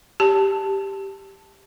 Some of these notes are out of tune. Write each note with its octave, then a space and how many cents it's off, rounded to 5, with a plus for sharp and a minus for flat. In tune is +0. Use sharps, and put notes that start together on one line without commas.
G4 +0 A5 +0